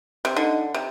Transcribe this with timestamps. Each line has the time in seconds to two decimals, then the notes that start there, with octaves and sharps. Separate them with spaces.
0.25 C3
0.36 D3 D#4
0.74 C3